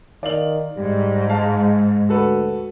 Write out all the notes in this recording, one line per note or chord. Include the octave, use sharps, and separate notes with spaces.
D#3 D5 F5 F#7
G#2 G3
G#3 F5 A5
D2 F#4 A4 B4